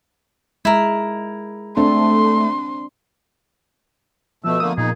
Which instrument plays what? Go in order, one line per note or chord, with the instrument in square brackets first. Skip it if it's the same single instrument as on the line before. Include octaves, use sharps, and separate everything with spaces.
[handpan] G#3 [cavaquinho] E4 A#4
[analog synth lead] A3 [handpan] C4 D4 [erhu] C6
[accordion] B2 A3 [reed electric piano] F3 B3 [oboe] E6
[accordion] D3 A3 A#3 [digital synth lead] D#6
[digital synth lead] A#2 [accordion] D#4 [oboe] G#4